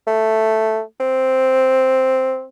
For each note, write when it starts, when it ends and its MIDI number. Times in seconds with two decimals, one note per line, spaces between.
0.07 0.81 57
1.00 2.45 60